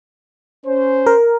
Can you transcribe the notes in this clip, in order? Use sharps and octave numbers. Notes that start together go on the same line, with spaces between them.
C#4 C5
A#4